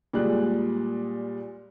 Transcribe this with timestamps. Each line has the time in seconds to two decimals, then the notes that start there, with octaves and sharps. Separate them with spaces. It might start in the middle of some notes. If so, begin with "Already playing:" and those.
0.13 A#2 G3 G#3 G#4 F#6